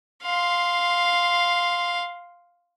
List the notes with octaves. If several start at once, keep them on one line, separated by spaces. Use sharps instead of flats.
F5 C6